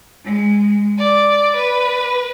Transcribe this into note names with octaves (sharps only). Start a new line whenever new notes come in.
G#3
D5
B4